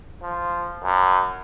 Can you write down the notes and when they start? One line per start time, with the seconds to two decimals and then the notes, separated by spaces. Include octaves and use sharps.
0.23 F3
0.84 F#2